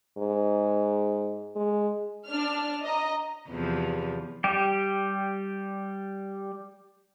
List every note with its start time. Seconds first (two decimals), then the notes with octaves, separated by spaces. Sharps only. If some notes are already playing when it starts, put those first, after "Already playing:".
0.18 G#2
1.56 G#3
2.27 D4 F6
2.85 D#5 A#5
3.48 E2 C3 F3
4.44 G3 G4